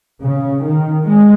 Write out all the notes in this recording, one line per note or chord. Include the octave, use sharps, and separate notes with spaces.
C#3
D#3
G#3